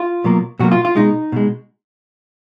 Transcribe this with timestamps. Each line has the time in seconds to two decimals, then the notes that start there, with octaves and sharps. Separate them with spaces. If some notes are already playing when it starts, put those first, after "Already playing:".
Already playing: F4
0.24 B2 F#3 A#3
0.59 B2 F#3 A#3 F#4
0.72 F4
0.85 F4
0.96 B2 G#3 D#4
1.32 B2 G#3